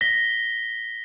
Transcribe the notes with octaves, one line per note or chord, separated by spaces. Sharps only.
A#6 B6 G7